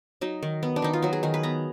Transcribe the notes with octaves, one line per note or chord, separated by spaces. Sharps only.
F#3 D#4
D#3
B3
D4
D#3 D#4
F4
F#3 F#4
G#4
D#3 G#4
B4
B3 A#5